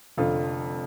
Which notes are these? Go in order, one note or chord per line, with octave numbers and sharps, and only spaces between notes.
F1 F2 D3 F4 A4